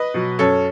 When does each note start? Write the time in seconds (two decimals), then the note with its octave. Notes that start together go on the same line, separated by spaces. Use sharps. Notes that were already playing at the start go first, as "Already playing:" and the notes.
Already playing: B4 D#5
0.14 B2 F#3
0.39 F#2 A4 C#5